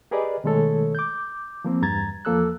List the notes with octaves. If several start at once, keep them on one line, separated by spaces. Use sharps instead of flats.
G4 G#4 A#4 B4 D5 D#5
B2 D#3 G#3 A3 A4 C#5
D6 G6
F3 A#3 C4
E2 G2 A#5 G#6 A6
E2 F3 A#3 A4 E6 F#6